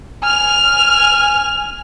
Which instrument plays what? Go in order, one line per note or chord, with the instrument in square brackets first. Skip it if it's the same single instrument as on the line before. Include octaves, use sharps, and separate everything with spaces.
[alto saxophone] G#5 [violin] F6 F7